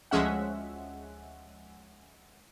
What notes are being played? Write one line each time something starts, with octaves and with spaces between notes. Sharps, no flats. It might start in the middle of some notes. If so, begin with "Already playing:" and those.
D2 F3 G#3 C#4 E5 F#5